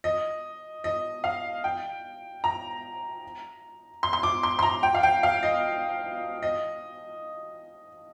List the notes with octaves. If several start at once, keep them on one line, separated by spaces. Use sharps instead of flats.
D#5
D#5
F5
G5
A#5
C6
C6
D6
C6
C6
A#5
G5
F5
G5
F5
D#5
D#5